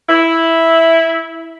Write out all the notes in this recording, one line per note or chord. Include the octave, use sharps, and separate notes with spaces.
E4